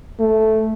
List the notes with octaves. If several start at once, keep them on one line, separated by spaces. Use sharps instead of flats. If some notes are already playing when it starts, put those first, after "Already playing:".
A3